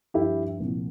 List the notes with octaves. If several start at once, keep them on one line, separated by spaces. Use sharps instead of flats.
G2 F3 E4 G4
C2 A#2 F3